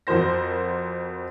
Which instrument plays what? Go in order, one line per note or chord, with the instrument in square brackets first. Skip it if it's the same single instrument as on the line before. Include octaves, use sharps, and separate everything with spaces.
[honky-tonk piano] F2 F#4 A#4 C5 A#6